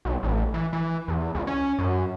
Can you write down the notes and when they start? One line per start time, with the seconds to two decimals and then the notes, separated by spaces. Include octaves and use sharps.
0.05 B1
0.23 A1
0.54 E3
0.73 E3
1.08 E2
1.35 C#2
1.47 C#4
1.79 F#2